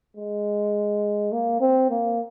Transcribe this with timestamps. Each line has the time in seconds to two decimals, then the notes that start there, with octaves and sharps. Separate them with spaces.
0.17 G#3
1.32 A#3
1.60 C4
1.90 A#3